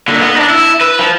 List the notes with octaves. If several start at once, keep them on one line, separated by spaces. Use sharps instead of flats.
A#2 D3
B3
D4 D#4
E4
B4
F3